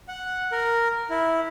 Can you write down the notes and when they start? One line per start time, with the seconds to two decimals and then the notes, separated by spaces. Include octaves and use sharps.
0.08 F#5
0.52 A#4
1.10 E4